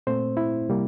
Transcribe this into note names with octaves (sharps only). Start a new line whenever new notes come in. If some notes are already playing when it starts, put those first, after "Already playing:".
A#2 A3 C4 C5
E4
C3 G3 A#3